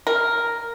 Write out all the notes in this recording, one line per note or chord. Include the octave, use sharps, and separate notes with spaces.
A#4